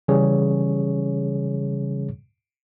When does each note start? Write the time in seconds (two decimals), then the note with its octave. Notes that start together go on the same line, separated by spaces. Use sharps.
0.08 C#3 E3 G3 C#4 G#4 C#5